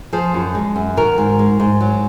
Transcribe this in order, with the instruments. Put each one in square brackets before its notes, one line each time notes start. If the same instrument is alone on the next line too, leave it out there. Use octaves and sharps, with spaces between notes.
[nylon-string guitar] F3 G#4 C5
F#2
G#3
F#2
D#3 F#4 A#4
G#2
G#3
G#2
F#3